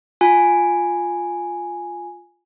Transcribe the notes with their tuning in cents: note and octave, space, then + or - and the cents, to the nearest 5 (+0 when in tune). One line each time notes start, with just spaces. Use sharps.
F4 +5 G#5 +0